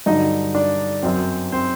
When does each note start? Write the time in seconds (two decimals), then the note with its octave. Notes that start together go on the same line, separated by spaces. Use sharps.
0.06 G2 D3 F#3 D#4 D#5
0.55 D4 D5
1.03 F#2 F#3 C4 C5
1.52 C4 C5